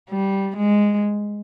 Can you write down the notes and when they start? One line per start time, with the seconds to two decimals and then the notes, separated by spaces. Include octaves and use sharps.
0.10 G3
0.56 G#3